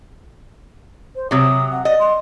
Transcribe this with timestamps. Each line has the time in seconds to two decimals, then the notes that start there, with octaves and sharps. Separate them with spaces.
1.16 C5
1.31 C3 F#3 D#6
1.72 F#5
1.85 D5 D#5
2.00 C6